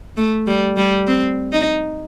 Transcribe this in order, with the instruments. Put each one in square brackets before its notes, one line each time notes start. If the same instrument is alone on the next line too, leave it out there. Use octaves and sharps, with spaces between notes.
[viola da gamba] A3
G3
G3
C4
D#4